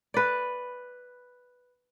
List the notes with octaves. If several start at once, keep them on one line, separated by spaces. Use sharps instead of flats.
B4 D5